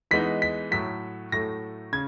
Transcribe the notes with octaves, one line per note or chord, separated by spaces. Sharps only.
E3 G#3 B3 D#4 B6
B6
A2 F#3 A3 B6
A2 F#3 A3 A#6
C#3 G#6